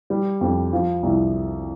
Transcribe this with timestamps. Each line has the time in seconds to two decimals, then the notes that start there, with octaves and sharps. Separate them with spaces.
0.10 G3
0.41 F2
0.73 F3
1.03 C2